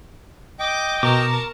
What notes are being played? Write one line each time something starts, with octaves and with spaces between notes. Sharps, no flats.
D#5 G5 D6
B2 A#4 A5 A#5 C#6 D6